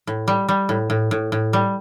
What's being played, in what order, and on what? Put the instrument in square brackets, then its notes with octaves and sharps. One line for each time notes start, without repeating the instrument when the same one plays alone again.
[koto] A2
G3
G3
A2
A2
A2
A2
G3